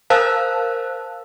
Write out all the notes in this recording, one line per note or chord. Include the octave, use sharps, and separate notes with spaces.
A#4 C5 F5 A5 E6 F#6